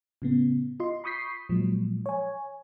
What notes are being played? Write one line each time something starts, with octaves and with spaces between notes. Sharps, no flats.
A2 C#3 B3
F4 D#5 C6
B5 C#6 D#6 G6 B6 C7
A#2 F3 F#3 G#3
C#5 G#5